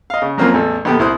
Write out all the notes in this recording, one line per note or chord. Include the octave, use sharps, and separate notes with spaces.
D#5 F5
C#3
F2 F#3 A#3 C4 C#4 F4
A1 E2 A4
A#1 D3 B3 G4 G5
C2 E4 C5 D#6 F#6